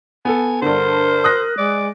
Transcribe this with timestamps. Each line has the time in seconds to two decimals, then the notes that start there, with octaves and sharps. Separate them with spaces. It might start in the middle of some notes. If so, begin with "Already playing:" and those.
0.25 B3 A4 G#5
0.62 G2 D3 A#4 C5
1.24 D#6 F#6 A#6
1.58 G#3 D5